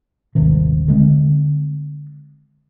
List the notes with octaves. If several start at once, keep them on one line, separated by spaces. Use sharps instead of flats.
D#1 G#1 C3 D#3
D3 G#3 B3 C4